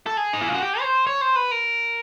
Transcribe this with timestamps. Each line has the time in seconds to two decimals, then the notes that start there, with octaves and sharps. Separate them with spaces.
0.06 A4
0.17 G#4
0.33 D#4
0.41 E4
0.48 F4
0.54 F#4
0.62 G4
0.80 C#5
0.84 C5
1.07 C#5
1.21 C5
1.36 B4
1.51 A#4